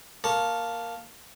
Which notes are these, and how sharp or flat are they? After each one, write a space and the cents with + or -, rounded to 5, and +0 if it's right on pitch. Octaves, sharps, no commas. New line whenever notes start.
A#3 +0 C#5 -20 A5 +0